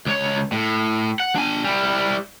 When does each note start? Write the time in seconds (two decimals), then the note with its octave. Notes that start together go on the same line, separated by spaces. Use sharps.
0.06 C#2 C#5
0.52 A2
1.20 F#5
1.36 D4 G#5
1.64 G3 E4